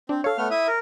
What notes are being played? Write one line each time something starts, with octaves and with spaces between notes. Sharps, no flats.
C4 D4
A4 C#5 F5
A3 B3 F6
E4 E5 D#6
A#4